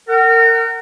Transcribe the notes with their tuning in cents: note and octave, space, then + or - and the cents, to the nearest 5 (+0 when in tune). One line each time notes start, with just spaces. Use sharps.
A#4 -30 F#5 +30